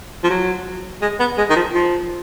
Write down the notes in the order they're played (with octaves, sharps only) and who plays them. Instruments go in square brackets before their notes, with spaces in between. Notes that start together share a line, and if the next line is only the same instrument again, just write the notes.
[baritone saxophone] F3
F#3
G#3
B3
G#3
D#3
F3
F3